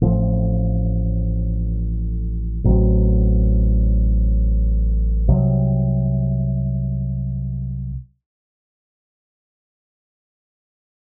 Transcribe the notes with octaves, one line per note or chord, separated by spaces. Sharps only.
A1 A2 F3 C4
A1 A2 F#3 C4
C2 C3 F#3